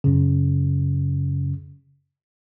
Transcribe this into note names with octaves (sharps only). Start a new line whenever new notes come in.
F#2 C#3